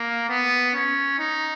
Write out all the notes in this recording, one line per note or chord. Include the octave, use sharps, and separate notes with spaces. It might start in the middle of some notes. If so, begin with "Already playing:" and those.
Already playing: A#3
B3
C#4
D#4